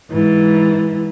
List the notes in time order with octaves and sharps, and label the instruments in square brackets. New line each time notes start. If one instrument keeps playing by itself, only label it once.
[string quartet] G#2 E3